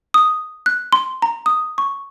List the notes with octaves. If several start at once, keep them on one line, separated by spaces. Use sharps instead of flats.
D#6
F#6
C6
A#5
D#6
C#6